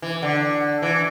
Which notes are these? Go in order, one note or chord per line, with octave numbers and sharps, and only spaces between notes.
E3
D3
E3